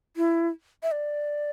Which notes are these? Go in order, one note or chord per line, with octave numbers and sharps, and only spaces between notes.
E4
E5
D5